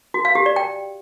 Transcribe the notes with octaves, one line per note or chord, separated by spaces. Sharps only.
F#4
F5
G4
D5
G5